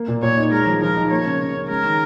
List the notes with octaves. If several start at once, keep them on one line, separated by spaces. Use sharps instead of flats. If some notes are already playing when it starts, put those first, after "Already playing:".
Already playing: A#3
A#2
A#2 C#5
D#4
G#3 A#4
F3
F3 A#4
D#4
A#3 C#5
C#3
C#3
C#4
G#3 A#4
D#3